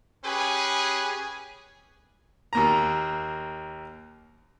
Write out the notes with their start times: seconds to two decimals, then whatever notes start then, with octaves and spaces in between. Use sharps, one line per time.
0.24 C#4 G4 G#4 B4 G#5
2.53 D#2 A#3 A#5